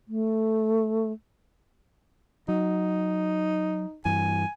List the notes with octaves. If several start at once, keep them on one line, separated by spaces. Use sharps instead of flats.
A3
F#3 D#4
G2 E3 G#5